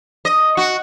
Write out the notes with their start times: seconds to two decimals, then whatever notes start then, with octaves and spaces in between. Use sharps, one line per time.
0.25 D#5
0.57 F#4